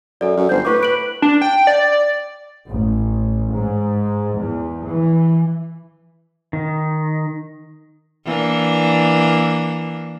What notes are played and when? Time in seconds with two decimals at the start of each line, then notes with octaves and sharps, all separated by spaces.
0.21 F#2 A4 D5
0.37 F#2
0.49 G1 C5 G6
0.65 A2 B4 C#6 D6
0.83 D7 F#7
1.22 D4
1.41 G5
1.67 D5
2.69 A1
3.54 G#2
4.41 E2
4.89 E3
6.53 D#3
8.25 E3 A#3 D4